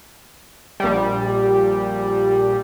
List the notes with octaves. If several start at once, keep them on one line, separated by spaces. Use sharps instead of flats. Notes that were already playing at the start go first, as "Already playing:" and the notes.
A#1 G3